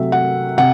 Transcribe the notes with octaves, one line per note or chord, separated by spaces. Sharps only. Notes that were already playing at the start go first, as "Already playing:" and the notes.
Already playing: C3 F#3 A3 E5
F#5
C3 F#5